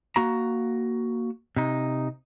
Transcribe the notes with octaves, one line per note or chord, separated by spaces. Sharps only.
A#3 F#4 A#5
C3 D#4